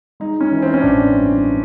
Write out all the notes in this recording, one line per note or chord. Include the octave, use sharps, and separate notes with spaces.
G#3 D#4
C#4
E3
C4
C#4
A1 D4
G2